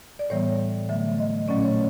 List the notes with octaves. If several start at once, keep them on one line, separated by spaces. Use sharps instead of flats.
D5
A2 E3 G3 B3 C#5
D3 F#3 A3 E5
D#5
A#2 F#3 A3 C#4 D5
C#5